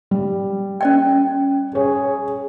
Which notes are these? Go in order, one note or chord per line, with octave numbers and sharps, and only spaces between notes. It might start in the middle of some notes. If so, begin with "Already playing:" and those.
G3
C#4 D5 G5
G#4 C#5